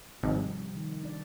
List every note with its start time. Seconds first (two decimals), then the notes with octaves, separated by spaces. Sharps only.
0.23 G#1 C3 F3 G3
0.75 D#3
1.03 D4 D5